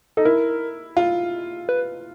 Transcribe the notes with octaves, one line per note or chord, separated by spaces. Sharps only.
D#4 A4
E4 A#4
F4
B4